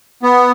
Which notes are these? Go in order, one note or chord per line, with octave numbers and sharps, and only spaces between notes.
B3